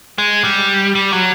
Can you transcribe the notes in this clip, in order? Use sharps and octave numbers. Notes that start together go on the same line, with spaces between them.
G#3
G3
G3
F#3